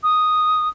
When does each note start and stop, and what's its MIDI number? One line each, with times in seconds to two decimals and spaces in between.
0.03 0.68 87